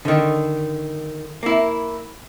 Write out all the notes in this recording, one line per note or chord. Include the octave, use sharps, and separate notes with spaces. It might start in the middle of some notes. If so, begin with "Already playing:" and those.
D3 D#3
A#3 E4